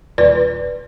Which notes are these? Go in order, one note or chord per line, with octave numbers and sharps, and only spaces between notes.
D#1 F4 B4 D5